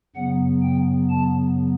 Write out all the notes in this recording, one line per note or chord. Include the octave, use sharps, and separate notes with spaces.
F#2 C#3 F#3 B3 F#5
G5
A5